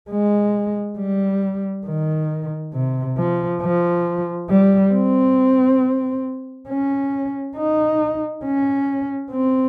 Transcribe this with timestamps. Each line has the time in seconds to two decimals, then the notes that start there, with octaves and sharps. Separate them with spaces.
0.10 G#3
0.98 G3
1.86 D#3
2.74 C3
3.17 F3
3.62 F3
4.50 G3
4.94 C4
6.69 C#4
7.56 D#4
8.45 C#4
9.31 C4